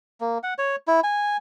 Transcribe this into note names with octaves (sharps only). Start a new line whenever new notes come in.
A#3
F#5
C#5
E4
G#5